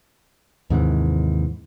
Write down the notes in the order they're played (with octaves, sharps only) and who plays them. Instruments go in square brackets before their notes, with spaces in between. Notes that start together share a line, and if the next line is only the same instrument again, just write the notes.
[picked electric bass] D#2 G#2 C3 E3